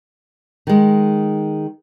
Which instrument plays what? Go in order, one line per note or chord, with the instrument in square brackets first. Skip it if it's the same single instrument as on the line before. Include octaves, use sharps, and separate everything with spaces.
[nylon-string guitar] D#3 G#3